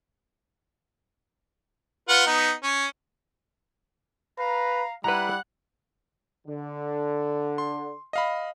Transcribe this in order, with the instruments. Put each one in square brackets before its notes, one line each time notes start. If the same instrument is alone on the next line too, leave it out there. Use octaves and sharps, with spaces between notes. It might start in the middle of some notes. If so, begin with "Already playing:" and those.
[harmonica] F4 B4 F#5
B3 D#4
C#4
[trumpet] B4 [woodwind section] F5 A#5
[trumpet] G3 [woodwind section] E4 [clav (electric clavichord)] B4 A#5 [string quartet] F#5 F#6
[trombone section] D3
[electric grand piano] C6
D#5 F5 B5